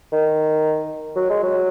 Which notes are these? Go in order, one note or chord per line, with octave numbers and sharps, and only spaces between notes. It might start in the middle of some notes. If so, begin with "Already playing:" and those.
D#3
F#3
G#3
F#3